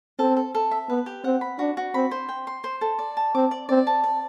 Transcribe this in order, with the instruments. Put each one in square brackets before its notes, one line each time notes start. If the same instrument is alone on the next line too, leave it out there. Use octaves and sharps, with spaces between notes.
[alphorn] C4 [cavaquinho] A4
[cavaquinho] A4
A4
E5
[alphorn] B3 [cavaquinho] B4
[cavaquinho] G4
[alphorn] C4 [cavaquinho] F#5
[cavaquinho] B5
[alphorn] D4 [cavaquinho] F#4
[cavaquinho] F#4
[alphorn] C4 [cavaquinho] B5
[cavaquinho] C5
G5
C6
C5
A4
D5
A5
[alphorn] C4 [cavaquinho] D6
[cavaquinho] D5
[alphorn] C4 [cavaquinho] D5
[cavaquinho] A5
D5